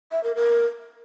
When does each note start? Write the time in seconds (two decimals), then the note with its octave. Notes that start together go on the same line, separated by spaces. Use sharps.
0.12 E5
0.23 A#4
0.35 A#4